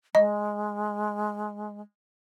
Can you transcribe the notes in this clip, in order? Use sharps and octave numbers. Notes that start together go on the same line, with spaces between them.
G#3 D#5